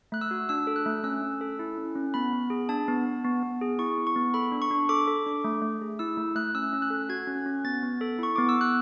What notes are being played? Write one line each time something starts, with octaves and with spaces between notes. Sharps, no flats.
A3 F#6
E6
F#4
D4 E6
A4
F#6
A3
C#4 E6
C#4
A4
E4
C#4
C#4
B3 B5
B3
G#4
D4 A5
B3
B3
B3
B3
G#4
E4 C#6
B3
C#6
B3
A4 B5
D4
C#6
D4
A4 D6
A4
D4
A3
A3
G#4
E4 E6
A3
A3 F#6
C#4 E6
C#4
F#6
A4
F#4 G#6
C#4
C#4
B3 A6
B3
A4
E4 C#6
B3 D6
E6
B3 F#6